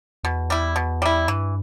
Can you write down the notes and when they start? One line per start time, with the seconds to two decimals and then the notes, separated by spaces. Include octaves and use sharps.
0.24 E2 B2
0.50 G3 E4
0.76 B2
1.02 G3 E4
1.28 G2 E3